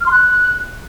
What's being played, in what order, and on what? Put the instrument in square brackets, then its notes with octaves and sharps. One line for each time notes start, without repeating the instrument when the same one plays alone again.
[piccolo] F6
C6
F#6